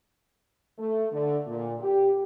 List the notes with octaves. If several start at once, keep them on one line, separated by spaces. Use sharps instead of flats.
A3
D3
A#2
G4